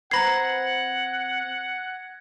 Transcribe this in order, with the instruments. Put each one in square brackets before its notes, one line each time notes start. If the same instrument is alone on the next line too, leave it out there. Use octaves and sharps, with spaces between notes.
[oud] C4 B4 [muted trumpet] F#5 [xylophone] A#5 B5 C7 [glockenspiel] G#6 A#6